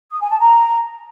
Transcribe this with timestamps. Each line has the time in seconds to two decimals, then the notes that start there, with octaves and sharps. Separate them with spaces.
0.11 D#6
0.20 G#5
0.30 A5
0.40 A#5